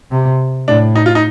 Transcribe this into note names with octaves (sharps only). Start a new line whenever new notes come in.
C3
A2 D4
D#4
F4
D#4